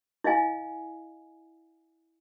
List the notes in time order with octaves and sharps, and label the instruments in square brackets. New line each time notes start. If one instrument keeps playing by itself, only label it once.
[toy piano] E4 D#5 F5 G#5